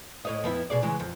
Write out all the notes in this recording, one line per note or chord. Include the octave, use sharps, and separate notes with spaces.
A2 C#5 D#5
F2 B3 E4
B2 G#4 D5
C#3 E3 G#3
F2